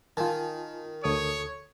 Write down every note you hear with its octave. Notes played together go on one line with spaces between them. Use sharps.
D#3 F4 G#5 A5
D2 A4 C#5 D#6